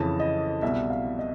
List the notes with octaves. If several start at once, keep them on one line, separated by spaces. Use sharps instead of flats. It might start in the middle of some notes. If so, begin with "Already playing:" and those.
Already playing: F2 C#3 E3 A5
D#5
C2 B2 E5
F5
D#5